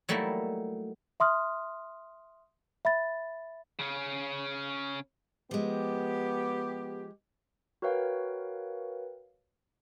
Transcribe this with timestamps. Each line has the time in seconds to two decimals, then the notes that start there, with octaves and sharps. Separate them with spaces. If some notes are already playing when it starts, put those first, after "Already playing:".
0.09 F#3 G3 A3 A#3 D#4 E4
1.20 E5 C6 D#6 F6
2.85 E5 B5 A6
3.79 C#3 C#4
5.51 F3 G#3 B3 G4
7.82 F#4 A#4 B4 C#5 F5 G5